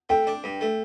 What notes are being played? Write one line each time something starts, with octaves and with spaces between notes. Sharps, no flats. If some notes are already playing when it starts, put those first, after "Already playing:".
A3 G5
D4
G2
A3